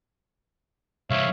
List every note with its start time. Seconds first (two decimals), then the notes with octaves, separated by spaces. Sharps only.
1.10 C2 E3 C#5 E5 F5